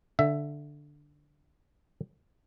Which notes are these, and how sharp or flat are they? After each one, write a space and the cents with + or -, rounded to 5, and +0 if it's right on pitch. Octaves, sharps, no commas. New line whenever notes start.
D3 +0 E5 +15